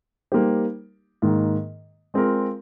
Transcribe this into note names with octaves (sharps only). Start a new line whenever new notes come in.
G3 A#3 D#4 G4 C5
G#2 D#3 A#3
G#3 C4 F4 A#4